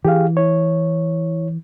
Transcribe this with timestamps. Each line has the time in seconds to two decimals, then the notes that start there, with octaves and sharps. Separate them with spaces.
0.05 E3 G4 G#4 F5
0.37 E4 C#5